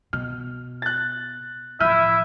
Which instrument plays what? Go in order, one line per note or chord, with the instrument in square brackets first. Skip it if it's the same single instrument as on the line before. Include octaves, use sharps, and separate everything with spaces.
[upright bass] B2 [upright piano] F6
[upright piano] F#6 A6
[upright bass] A1 F3 [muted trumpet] E4 [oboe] E5 [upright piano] F6 G6 D#7